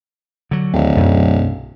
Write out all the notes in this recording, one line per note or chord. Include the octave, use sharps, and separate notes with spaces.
D3 F#3
D1 D#2
B1 F#2